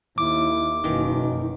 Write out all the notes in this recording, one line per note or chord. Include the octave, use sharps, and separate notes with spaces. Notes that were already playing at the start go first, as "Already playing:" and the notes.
D#2 E4 D6
F#1 B2 D#3 E3 A#3